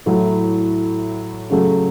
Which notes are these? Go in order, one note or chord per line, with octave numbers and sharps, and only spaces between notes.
A2 F#3 A3 E4
C#3 F#3 A3